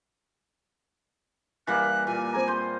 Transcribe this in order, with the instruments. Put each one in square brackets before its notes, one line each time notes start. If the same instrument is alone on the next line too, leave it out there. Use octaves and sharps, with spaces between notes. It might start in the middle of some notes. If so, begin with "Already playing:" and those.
[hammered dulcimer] E3 G3 A#3 [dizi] F#6
[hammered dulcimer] A#2 [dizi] G#5
[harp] C4 G#4 A#5
[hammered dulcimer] C5 [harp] G6